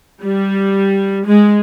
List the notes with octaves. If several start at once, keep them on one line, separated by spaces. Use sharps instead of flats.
G3
G#3